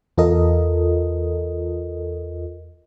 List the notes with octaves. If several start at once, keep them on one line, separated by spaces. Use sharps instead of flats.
E2 F4 A4 A#4 D#5